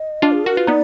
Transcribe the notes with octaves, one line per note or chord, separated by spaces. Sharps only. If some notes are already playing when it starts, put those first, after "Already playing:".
Already playing: D#5
D4 F4
G#4
F#4 A#4
F4 B4
B3 D#4 D5